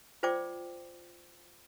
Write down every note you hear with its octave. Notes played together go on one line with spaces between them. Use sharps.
F4 C5 D5 G5 D6